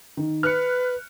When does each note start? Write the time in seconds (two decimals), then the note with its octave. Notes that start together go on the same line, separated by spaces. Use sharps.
0.17 D#3
0.43 B4 F6 F#6 C#7